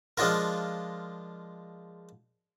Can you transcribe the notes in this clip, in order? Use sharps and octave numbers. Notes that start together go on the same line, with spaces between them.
F3 G#3 D4 F4 A#4